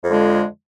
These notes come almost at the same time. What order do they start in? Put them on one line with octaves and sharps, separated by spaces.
F2 D3 G#3 F3